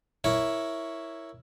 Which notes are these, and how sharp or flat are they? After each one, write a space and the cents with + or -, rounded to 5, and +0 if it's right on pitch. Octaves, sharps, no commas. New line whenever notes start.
E4 +0 A#4 +0 C#5 +0